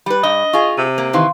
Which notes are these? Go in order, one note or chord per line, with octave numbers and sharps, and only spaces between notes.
G3 B4 B5
G2 D#5
F4 G#4 C#6
C3 D#7
A#3
D#3 E3 C4 F5 C6